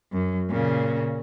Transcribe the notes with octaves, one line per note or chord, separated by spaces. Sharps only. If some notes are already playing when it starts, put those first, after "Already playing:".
F#2
A#2 C#3